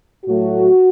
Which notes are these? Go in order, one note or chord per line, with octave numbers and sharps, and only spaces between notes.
A2 F#3 A3 F#4